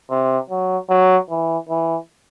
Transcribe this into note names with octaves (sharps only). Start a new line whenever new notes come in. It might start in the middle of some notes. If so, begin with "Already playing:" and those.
C3
F#3
F#3
E3
E3